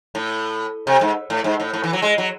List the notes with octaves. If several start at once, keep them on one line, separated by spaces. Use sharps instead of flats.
A2
C3
G#2
A2
G#2
A2
A2
E3
F#3
G#3
F#3